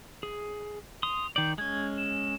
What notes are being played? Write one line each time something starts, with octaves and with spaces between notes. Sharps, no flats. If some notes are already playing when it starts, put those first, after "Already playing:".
G#4
C6 D#6 F7
D#3 D5 G6
G#3 C#4 G#6
E7